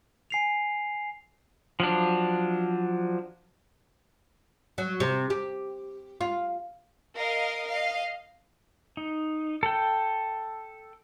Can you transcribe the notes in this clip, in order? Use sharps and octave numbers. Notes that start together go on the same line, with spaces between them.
G#5 C7 F7
F3 F#3 D4
F#3
C3
G4
F4
A#4 D#5 F5
D#5 F5
D#4
A4 G5